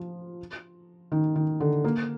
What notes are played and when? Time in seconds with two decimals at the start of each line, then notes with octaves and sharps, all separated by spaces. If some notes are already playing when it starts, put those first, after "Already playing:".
Already playing: F3
1.12 D#3
1.36 D#3
1.60 D3
1.84 A#3